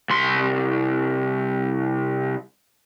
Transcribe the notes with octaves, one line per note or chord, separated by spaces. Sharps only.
C2 C6